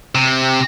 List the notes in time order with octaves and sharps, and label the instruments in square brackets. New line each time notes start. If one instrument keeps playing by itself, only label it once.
[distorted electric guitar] C3